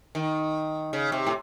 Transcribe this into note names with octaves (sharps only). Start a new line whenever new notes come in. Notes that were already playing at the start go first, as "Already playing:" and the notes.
D#3
C#3
C3
A2